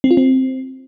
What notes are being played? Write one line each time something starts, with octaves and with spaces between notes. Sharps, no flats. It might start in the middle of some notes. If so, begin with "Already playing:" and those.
C4
F4
C4